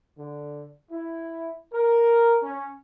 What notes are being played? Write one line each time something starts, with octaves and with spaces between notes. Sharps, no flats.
D3
E4
A#4
C#4